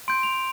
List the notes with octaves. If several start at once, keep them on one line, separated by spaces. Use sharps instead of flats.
C6 G6 D7
F7